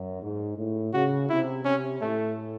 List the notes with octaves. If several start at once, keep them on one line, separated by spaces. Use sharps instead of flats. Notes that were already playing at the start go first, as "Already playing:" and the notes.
Already playing: F#2
G#2
A2
C#3 F#4
C3 E4
C3 C#4
A2 A3